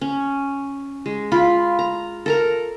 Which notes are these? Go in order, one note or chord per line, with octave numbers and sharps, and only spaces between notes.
C#4
G#3
F4 B5
A#5
A4 A#4 A#5